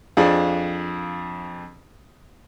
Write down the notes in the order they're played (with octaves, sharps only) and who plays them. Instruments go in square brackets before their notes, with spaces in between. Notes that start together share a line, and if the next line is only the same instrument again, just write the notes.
[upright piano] F2 F3 D4 G#4